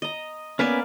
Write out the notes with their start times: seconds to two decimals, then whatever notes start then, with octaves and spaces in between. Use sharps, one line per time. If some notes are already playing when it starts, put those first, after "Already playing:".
0.02 D#5 A#5
0.59 A#3 B3 C#4 B4 D5 G#5